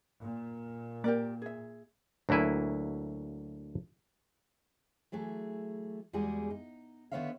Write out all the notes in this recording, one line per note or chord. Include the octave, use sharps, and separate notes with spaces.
A#2
A#3 G4 A#4 D5
G#4 E5
D2 F#3 A#3 E4 G#5
E3 F#3 A3 G#4
E2 G3 G#3 F#4 G#4
D#4
D3 D#3 B3 C#5 E5 F5